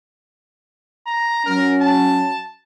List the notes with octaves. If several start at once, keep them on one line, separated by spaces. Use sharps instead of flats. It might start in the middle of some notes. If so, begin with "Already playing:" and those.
A#5
F#3 C#4 A#4
A5